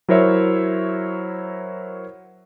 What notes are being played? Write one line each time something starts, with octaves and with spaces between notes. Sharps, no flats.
F#3 E4 A#4 C5 C#5 E5